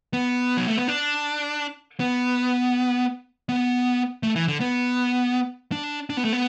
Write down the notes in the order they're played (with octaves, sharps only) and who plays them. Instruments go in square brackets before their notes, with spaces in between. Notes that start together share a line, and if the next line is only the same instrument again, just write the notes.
[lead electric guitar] B3
F#3
A3
B3
D4
B3
B3
A3
E3
D3
B3
D4
D4
B3
A3
B3